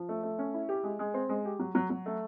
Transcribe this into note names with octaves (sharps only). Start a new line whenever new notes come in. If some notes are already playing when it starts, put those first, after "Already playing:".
Already playing: F3
A3
A3
C#4
E4
G4
G#3
G#3
C4
G#3
G4
F#3
F#3
F#3
A3